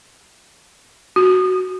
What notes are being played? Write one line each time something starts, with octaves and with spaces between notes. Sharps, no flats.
F#4